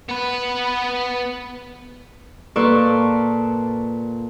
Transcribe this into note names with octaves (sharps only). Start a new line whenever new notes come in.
B3 B4
A#2 F4 A4 B4 D5 C#6